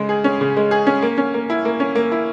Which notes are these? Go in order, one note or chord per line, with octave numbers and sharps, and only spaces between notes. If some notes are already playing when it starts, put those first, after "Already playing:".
Already playing: C#3 G#3
G#4
C#4
C#3
G#3
G#4
C#4
A#3
C#4
A#3
E4
A#3
C#4
A#3
E4